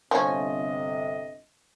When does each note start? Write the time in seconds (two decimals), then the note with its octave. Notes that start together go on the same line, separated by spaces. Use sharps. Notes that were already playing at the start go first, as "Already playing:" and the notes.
0.11 G1 C3 F3 C#4 D#5